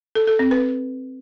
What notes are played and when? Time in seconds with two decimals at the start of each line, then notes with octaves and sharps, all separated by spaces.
0.15 A4
0.27 A4
0.39 C4
0.51 B4